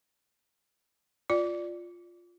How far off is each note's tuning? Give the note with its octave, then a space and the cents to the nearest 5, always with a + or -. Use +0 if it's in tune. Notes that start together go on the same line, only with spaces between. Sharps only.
F4 +0 D5 +0